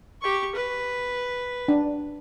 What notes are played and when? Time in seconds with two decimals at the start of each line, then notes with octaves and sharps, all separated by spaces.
0.22 G4 C#6
0.55 B4
1.68 D4